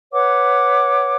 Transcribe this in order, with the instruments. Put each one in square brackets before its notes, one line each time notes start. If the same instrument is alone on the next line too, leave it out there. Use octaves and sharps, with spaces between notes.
[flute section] B4 C#5 F#5 D6